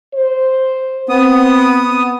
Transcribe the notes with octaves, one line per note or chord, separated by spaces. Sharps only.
C5
B3 C4 D#6